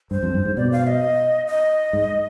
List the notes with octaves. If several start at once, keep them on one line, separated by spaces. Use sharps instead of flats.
G2 C5
F2
G2
G#2
B2 D5
F5
D#5
D#5
G#2